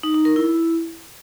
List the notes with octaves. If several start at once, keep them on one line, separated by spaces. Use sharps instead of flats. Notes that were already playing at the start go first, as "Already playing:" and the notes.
D#4
D#4
A#4
E4